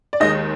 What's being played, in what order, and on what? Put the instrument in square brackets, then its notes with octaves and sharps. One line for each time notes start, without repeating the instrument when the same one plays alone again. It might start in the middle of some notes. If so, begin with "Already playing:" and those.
[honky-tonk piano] D5
D#2 D#3 G#3 D#5